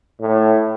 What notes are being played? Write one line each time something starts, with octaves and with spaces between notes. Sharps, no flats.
A2